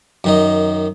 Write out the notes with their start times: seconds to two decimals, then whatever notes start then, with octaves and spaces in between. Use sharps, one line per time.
0.24 F#2 D#3 D#5